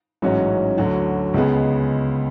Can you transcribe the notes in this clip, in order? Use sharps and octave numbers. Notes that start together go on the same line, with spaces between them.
A1 G#2 F#3 C#4 F#4
D2 D3 F#3
C#2 C#3 G#3 B3